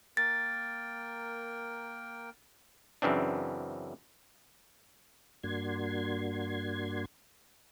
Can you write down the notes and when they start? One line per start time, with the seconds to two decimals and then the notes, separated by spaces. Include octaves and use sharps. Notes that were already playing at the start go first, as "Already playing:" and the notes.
0.17 A#3 A#4 G5 A6
3.02 F#2 C#3 E3 C4 D4
5.43 G2 A#3 D4 F#4 C6 G#6